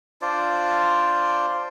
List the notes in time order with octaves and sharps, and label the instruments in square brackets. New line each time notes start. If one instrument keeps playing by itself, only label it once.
[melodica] D4 F4 C5 D5